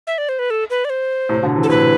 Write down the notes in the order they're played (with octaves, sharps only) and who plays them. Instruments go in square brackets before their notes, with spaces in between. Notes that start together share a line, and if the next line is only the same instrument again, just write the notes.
[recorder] E5
D5
C5
B4
A4
B4
D5
C5
[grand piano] A2 C3
B2 D3
C3 E3
[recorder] A4
[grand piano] A2 C3 [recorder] B4